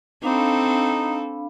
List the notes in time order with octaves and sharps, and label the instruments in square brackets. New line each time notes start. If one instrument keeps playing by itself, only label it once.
[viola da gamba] C4 A4 [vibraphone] D4 F5 B5 [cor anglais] D#4